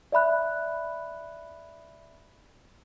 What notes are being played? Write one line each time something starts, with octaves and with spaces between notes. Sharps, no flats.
D5 E5 B5 F#6